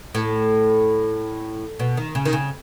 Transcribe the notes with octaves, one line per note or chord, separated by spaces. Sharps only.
A2
B2
D#3
C#3
D#3
C#3